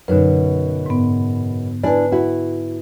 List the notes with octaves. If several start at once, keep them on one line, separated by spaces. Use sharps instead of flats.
F#2 B2 D3 D#4 B4
G#2 B3
D4 E4 B4 D5 G#5
E4 F#4